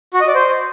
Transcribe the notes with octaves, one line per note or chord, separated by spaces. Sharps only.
F#4
D#5
D5
C5